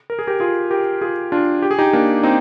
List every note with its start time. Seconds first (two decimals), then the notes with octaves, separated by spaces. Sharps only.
0.10 A#4
0.19 G#4
0.27 G4 A#4
0.40 F4 G#4
0.71 G4 A#4
1.01 F4 G#4
1.32 D4 F4
1.62 G4
1.71 G#4
1.78 D#4 G4
1.93 A#3 D4
2.23 C4 D#4